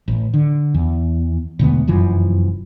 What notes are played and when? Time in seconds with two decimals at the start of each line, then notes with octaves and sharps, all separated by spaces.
0.08 A1
0.34 D3
0.74 E2
1.59 E1 D2 B3
1.87 F1 F#2 E3 F3